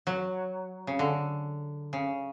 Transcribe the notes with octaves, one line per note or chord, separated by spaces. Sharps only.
F#3
C#3
D3
C#3